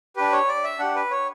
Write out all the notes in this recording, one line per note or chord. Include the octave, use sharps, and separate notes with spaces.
D4 G4 B4
C#5
D5
E5
D4 G4 F#5
B4
C#5